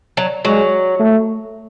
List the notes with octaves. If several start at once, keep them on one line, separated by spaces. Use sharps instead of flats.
F#3
F#3 G#3
A3